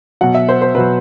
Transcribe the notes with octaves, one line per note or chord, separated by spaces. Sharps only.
B2 F#3 F#5
E5
C5
C5
B2 F#3 B4